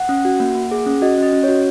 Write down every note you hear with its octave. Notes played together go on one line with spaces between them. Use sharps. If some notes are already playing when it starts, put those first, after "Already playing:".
Already playing: F#5
C#4
F#4
A#3
A#3
G#4
C#4
F#4 D#5
C#4 D#5
C#4
F#4 C#5